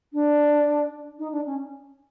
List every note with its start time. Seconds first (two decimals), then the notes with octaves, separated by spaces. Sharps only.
0.13 D4
1.19 D#4
1.32 D4
1.46 C#4